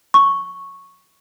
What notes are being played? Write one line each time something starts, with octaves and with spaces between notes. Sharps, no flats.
C#6